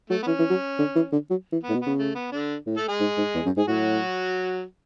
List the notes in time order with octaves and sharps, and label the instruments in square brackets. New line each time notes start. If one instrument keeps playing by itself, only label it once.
[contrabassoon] F#3 [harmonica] A3
[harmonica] B3
[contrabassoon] E3 [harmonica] C#4
[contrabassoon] E3
F#3
D3
E3
D3
F#3
E3
[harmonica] B3
[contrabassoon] A2
B2
[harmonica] B3
[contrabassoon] C#3
[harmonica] A3
B3
D3 D4
[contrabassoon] A2
[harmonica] A3 A4
G#3 G#4
[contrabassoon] G#2
G#2
E2
F#2
[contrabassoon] G#2 [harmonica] G#4
[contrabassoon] A2 [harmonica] F#3 F#4